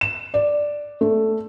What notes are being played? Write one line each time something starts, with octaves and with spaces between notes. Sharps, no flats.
E7
D5
A3